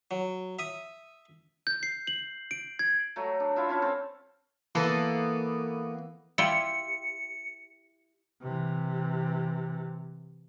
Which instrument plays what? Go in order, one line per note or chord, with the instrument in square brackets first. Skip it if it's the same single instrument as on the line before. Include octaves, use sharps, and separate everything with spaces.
[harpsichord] F#3
E5 D#6
[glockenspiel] G6
C7
F#7
D7
G#6
[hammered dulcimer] F#3 A3
D4
E4 F4 E5
C#4 F4 A5 C#6
C4 A4
[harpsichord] E3 [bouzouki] A#3 B3 A4
[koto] E4 F4 G4 [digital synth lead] C#7
[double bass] C3 E3